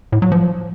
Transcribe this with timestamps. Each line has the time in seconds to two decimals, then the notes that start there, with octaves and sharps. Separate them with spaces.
0.12 A2
0.22 F#3
0.32 F3